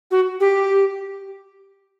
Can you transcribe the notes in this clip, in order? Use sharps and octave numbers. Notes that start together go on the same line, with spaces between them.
F#4
G4